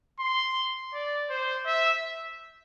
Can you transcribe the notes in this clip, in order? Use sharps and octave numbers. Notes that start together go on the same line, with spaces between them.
C6
D5
C5
E5